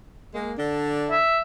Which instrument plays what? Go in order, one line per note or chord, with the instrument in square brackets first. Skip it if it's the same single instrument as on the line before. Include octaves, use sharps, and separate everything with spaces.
[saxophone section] G#3 A#3
D3 D4
[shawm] E5